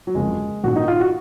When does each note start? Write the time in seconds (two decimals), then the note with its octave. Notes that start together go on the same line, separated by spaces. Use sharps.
0.07 F#3
0.15 F#1 F2 C#3 G#3
0.64 A#1 G#2 D#3 F#4
0.76 D#4
0.88 F4
1.00 F#4